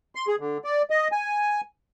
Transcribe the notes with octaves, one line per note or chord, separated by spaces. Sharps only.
C6
G#4
D3
D5
D#5
G#5